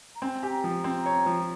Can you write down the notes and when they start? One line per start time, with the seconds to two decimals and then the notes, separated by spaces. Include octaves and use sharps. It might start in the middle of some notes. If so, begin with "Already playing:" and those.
0.16 A#5
0.22 C4 G#5
0.40 G4 G#5
0.50 A#5
0.64 F3
0.78 A#5
0.84 C4
1.06 C#5
1.26 F3